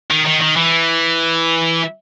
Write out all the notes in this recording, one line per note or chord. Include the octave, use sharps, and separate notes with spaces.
D#3
D#3
D#3
E3